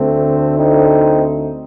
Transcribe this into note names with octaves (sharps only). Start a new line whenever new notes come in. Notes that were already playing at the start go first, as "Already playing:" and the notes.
Already playing: D2 D3 A3 C4
C4 D#4